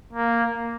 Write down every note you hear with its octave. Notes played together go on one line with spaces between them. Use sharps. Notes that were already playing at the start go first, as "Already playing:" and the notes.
A#3